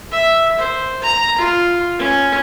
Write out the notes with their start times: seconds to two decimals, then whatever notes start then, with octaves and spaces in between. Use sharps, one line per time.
0.12 E5
0.59 C5
1.02 A#5
1.38 F4
1.98 C#4